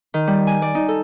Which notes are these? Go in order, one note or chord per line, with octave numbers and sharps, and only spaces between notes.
D#3
G3
G#5
D5
D#4
A4